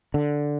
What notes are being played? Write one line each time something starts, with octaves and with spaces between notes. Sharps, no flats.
D3